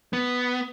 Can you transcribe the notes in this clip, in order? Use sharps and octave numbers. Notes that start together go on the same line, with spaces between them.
B3